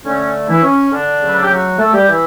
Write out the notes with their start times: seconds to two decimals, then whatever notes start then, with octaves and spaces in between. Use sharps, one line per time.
0.05 D3 A3 C#4
0.49 E3 E4
0.63 C#4
0.92 D3 D4
1.21 C#3 F#3 A3
1.28 B4
1.35 A4
1.42 G4
1.50 F#3 F#4
1.79 A3 A4
1.93 G3 G4
2.07 E3 E4